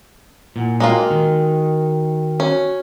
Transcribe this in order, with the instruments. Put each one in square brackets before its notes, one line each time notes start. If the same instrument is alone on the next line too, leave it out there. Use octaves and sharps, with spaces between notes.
[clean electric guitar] A#2 [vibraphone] E4 F#5 G#5
[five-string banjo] G#3 A#3 F4 [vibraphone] F#4 A#4 G5
[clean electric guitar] D#3
[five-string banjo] C#4 [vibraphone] F#4